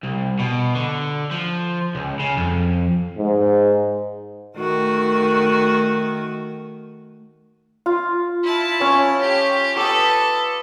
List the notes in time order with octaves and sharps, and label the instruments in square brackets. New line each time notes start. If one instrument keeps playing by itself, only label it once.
[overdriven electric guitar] C2
B2
D3
F3
C#2
C#3
F2
[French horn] G#2
[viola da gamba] D#3 A3 F#4
[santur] F4
[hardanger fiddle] E4 A5
[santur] C#4 C#5
[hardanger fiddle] G4
[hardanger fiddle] A4 B4 [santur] D6 D#6